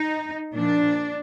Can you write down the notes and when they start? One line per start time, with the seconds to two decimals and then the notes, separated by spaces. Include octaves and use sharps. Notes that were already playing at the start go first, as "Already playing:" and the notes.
Already playing: D#4
0.55 A#2 F3 D4